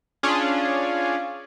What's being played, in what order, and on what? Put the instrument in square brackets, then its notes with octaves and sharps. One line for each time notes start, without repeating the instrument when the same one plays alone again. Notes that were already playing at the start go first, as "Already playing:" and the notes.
[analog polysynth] C#4 D4 F4 G#4